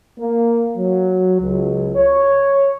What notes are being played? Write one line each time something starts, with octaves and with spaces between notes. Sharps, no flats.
A#3
F#3
C#2
C#5